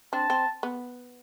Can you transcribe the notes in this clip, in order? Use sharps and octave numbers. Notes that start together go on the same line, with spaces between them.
C4 D4 A5
C4
B3